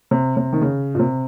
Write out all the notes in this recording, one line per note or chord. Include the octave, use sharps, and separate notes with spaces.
C3
C3
D#3
C#3
A#2
C3